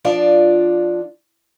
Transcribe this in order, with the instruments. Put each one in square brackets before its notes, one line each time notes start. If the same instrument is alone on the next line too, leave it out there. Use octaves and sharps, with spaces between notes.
[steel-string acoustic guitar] F3 D4 F4 D5